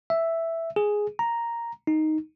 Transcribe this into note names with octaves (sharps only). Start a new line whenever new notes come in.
E5
G#4
A#5
D#4